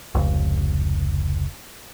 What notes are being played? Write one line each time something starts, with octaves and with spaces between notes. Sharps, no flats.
F1 C#2